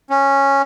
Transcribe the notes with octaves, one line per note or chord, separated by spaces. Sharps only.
C#4